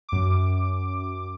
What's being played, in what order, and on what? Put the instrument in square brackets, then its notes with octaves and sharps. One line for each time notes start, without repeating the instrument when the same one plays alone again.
[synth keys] F#2 D6